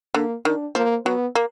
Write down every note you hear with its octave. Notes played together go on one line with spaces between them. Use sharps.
D3 A#3
D#3 D4
F3 A#3
F#3 B3
A#3